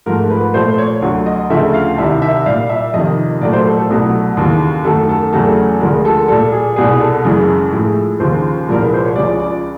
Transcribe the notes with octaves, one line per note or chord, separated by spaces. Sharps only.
G#2 F3 A3 A#4
B4
A#2 F3 A3 C5
C#5
D2 D3 F#3
D#5
D2 C#3 F3 A3 E5
F5
C2 C3 D#3 E5
E5
A#2 G3 F5
E5
F2 C3 D#3 D#5
A#2 F#3 A3 D5
C5
A4
A4
C2 B2 F#3 A3
D#2 C#3 E3
F#2 D#3 F#3 A3 A4
A4
E2 C#3 F#3 A3 A4
D2 D3 F3 G#3 A#4
A4
A#2 G3 A4
G#4
C2 B2 G3 G#4
A4
F#2 C#3 E3 G#3
A2 F3 G#3
D#2 C#3 F3 C5
C2 A#2 F3 G#3 A#4
B4
C5
C#5
C#2 C#3 F3 G#3 D5
D5